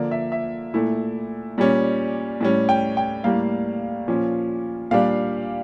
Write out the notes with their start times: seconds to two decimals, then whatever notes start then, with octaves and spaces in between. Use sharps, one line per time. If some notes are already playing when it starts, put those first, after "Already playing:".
Already playing: D3 F3 A#3 D5
0.11 E5
0.32 E5
0.74 A#2 A3 E4
1.58 A#2 G3 C#4
2.41 A2 G3 C#4
2.69 G5
2.97 G5
3.24 A2 G3 A#3 F5
4.08 A#2 F3 C#4
4.91 A#2 G3 D4 F5